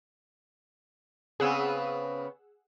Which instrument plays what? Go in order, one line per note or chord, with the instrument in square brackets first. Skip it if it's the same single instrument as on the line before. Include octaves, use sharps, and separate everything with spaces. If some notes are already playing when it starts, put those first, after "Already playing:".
[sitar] C#3 B3 C4 [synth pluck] G#4 F#5 E6